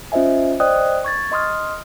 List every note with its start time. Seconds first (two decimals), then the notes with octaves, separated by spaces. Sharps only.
0.12 C#4 F4 C5 D#5 E5 G#5
0.60 C5 D5 D#5 G5 D#6 F#6
1.05 C#6 G#6 A6
1.32 D#5 C6 D#6 F6